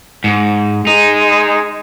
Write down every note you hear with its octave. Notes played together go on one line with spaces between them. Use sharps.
G#2
G#3 D#4